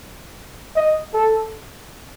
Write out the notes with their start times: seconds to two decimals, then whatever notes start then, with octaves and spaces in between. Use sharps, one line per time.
0.76 D#5
1.14 A4